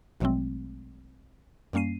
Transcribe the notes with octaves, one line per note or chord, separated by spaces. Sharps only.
A#1 B2 F#3 G#3 A3 C4
F#2 G3 A#3 C#4 C7 D#7